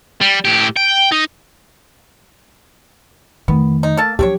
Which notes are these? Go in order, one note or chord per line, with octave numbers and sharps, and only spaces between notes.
G3
A2 G4
G5
D#4
F2 D#3 A3 B3
D#4
A#3 A4 A5
F3 F#3 A3 D4 G4 C#5